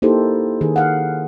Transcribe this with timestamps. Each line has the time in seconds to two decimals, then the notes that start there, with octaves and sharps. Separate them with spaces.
0.02 A#3 D#4 E4 G4 A4 C5
0.61 D#3 G#4
0.76 F5 F#5